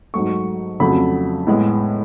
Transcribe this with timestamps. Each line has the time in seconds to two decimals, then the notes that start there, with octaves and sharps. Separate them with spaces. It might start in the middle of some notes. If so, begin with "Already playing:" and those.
0.14 G#2 F#3 A3 C#6
0.80 F2 C#3 F#3 A3 B5
1.47 A2 G#3 B3